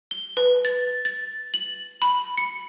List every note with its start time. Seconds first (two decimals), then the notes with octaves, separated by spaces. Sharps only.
0.11 G7
0.37 B4
0.65 A6
1.05 A6
1.54 F#7
2.02 B5
2.37 C#7